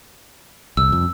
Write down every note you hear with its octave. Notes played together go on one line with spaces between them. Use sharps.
C2 E6
F2